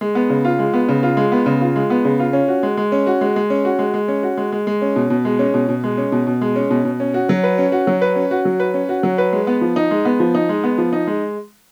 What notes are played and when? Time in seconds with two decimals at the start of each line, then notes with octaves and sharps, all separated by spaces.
0.01 G#3
0.15 B3
0.30 C#3
0.45 F4
0.59 G#3
0.74 B3
0.88 C#3
1.03 F4
1.17 G#3
1.32 B3
1.46 C#3
1.61 F4
1.76 G#3
1.90 B3
2.05 C#3
2.19 F4
2.33 C#4
2.48 F#4
2.63 G#3
2.77 G#3
2.92 C#4
3.07 F#4
3.21 G#3
3.36 G#3
3.50 C#4
3.65 F#4
3.79 G#3
3.94 G#3
4.08 C#4
4.23 F#4
4.37 G#3
4.52 G#3
4.67 G#3
4.82 C#4
4.96 B2
5.10 B2
5.25 G#3
5.39 C#4
5.54 B2
5.69 B2
5.84 G#3
5.98 C#4
6.12 B2
6.27 B2
6.41 G#3
6.56 C#4
6.70 B2
6.85 B2
7.00 C#4
7.14 F#4
7.29 F#3
7.43 B4
7.58 C#4
7.72 F#4
7.87 F#3
8.01 B4
8.16 C#4
8.31 F#4
8.45 F#3
8.60 B4
8.74 C#4
8.89 F#4
9.03 F#3
9.18 B4
9.33 G#3
9.47 B3
9.61 F3
9.76 D#4
9.91 G#3
10.05 B3
10.20 F3
10.35 D#4
10.49 G#3
10.64 B3
10.78 F3
10.93 D#4
11.07 G#3